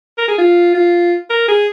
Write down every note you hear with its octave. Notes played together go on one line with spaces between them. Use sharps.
A#4
G#4
F4
F4
A#4
G#4